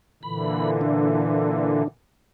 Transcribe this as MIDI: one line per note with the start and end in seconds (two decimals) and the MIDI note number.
0.23 1.83 46
0.23 1.83 50
0.23 1.83 52
0.23 0.70 83
0.81 1.88 62